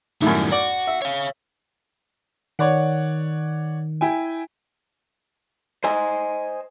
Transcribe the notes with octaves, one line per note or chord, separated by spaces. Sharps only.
F#2 A2 D#3 G3
F#4 D5
E5
C#5 F5
D#3 C#5 D5 F#5
E4 G5 G#5
C5 D#5 G#5